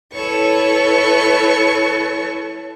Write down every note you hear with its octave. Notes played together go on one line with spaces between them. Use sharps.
E4 A4 B4 C#5 C#6